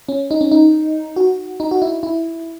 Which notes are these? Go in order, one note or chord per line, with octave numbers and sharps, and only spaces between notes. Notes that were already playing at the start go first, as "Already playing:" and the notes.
C#4
D#4
C#4
D#4
F#4
D#4
F#4
E4
E4